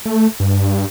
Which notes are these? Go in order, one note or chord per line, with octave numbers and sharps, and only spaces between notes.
A3
G2